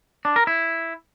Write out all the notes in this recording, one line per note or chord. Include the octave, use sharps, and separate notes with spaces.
D4
A#4
E4